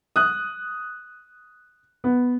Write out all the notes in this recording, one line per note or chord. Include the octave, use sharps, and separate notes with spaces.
D#6 F#6
B3